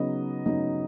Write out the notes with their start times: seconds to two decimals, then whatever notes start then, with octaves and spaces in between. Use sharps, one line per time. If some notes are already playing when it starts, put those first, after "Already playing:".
Already playing: C#3 F#3 B3 D#4 D#5
0.46 C#3 F#3 B3 D#4